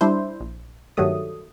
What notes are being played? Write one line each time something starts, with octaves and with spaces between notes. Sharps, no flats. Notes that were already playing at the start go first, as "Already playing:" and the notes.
G3 D4 E4 C5
A#1
G2 D#3 F#3 G3 A3 D#6